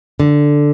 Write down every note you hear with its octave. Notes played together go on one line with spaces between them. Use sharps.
D3